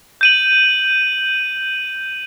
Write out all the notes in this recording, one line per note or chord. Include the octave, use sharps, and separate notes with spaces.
G6 D#7 F#7